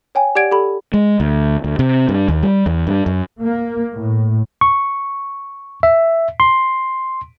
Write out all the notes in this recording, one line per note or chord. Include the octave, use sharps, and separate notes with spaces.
C#5 G5 G#5
G4 D5 F#5 G#6 D7
G4 A4 B5
G#3
D2
D2
C3
G2
D#2
G3
E2
G2
F#2
A#3
A2
C#6
E5
C6